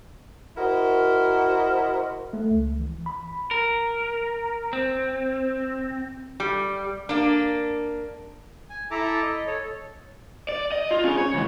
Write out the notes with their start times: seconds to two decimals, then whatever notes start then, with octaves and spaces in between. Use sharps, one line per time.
0.56 E4 F#4 A#4 C5 D#5
2.33 A3
2.51 C#2
2.79 E3
3.06 B5
3.51 A#4
4.73 C4
6.40 G3
7.09 A#3 D4
8.70 G#5
8.91 E4 A4 E5 A5 A#5 D6
9.22 D#5
9.47 A4 C#5
10.49 D5
10.72 D#5
10.91 F4
11.04 C#4 G#4
11.18 C#5
11.34 C#2 E3